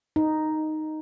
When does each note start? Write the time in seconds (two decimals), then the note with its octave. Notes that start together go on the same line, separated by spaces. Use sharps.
0.16 D#4